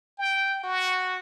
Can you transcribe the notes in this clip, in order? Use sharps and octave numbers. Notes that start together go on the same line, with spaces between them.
G5
F#4